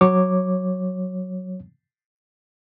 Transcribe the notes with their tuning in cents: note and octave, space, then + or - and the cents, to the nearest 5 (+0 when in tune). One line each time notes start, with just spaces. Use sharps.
F#3 +0 C#5 -15 D6 +0